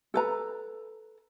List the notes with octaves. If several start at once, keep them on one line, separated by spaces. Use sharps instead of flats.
A4 B4 A#5